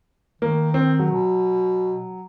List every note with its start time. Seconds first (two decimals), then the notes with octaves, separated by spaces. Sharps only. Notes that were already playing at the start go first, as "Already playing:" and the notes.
0.42 D#3 A#3
0.74 C4
0.99 F#3
1.12 B2